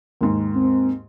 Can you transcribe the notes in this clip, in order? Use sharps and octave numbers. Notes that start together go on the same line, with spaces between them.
D#2 G#2
C4